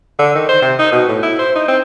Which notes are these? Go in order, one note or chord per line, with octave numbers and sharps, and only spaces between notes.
D3
D#3
C5
C3
D#4
B2
A2
E4
C5
D#4
C4